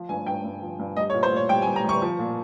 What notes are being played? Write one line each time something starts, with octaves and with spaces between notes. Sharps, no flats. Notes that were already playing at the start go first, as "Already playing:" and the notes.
Already playing: F3
G2 G#5
G2 G5
G2
F3
G2
G3 D#5
C#5
A#2
C5
A#2 C#5
G3 G5
G#5
G3
A#5
G3 C#6
F3
A#2